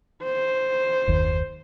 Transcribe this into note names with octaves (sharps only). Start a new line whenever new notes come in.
C5
F#1 D#2